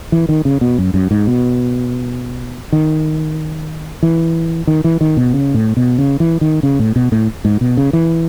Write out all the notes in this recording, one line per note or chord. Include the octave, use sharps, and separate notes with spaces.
E3
D#3
C#3
B2
F#2
F#2
G#2
B2
D#3
E3
D#3
E3
D#3
B2
C#3
A2
B2
C#3
E3
D#3
C#3
A2
B2
A2
G#2
B2
C#3
E3